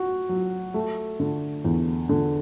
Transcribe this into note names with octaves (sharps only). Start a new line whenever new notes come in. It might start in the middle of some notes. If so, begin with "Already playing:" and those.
Already playing: F#4
F#3
A3
D3
E2
D3